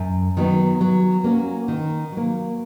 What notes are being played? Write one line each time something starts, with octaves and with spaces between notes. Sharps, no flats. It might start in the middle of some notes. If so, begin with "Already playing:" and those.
Already playing: F#2
D#3 F#3 B3
F#3
A#3 C#4 F#4
D#3
F#3 A#3